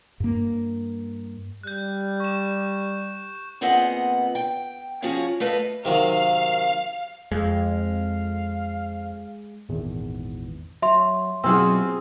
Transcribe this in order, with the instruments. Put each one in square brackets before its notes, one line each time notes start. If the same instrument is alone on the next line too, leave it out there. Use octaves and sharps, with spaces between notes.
[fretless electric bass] G2 A#3
[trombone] G3 [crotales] F#6 G6
[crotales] C#6 E7
[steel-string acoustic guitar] A#2 B3 C4 G#4 D#5 F#5
G5
F3 C#4 F#4 G#4 C#5 F5
A3 B4 D#5 F5
[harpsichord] C3 D#3 F#3 [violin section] F5
[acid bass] F2 [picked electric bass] G#3 [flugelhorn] F5
[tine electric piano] G#1 E2 A#2
[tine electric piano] F#3 [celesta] E5 C6
[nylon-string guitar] B2 F#3 [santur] C4 F4 G#4 [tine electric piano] G#5